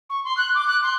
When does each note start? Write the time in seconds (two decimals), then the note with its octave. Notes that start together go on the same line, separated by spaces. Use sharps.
0.10 C#6
0.24 C6
0.37 F#6
0.55 D6
0.68 F#6
0.83 C6